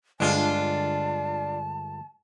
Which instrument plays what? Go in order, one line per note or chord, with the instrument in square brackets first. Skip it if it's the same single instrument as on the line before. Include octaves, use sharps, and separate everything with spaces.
[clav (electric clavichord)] G1 G#3 [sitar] D4 F4 [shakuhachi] A5